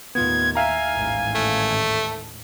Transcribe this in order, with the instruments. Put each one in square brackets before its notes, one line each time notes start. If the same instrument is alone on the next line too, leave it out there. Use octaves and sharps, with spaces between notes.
[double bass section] D#2 A2 [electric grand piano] B3 F4 [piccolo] G#6
[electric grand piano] E5 F5 A#5 [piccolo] G#5
[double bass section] A1 D#2 G#2
[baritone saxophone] A3